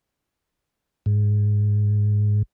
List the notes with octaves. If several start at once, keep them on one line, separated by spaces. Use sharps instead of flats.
G#2